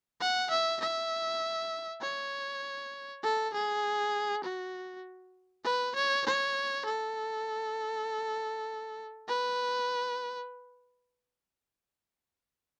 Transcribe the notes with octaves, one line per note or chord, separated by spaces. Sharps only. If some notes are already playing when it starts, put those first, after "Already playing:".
F#5
E5
E5
C#5
A4
G#4
F#4
B4
C#5
C#5
A4
B4